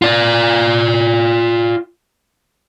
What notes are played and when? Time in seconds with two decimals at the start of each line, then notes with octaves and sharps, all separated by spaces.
0.02 F4 D5